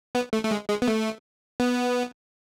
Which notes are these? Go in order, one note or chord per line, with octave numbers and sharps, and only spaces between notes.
B3
A3
A3
G#3
G#3
B3
A3
B3